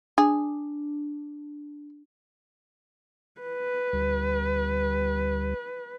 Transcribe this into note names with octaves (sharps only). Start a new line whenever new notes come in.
D4 G#4
B4
D2 G3